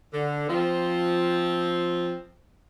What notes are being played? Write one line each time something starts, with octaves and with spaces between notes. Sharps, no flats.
D3
F3 C4